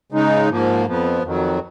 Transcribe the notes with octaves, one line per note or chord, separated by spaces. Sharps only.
C#3 G#3 D#4
G#2 F3 A#3
F2 F3 B3
F2 D#3 F#3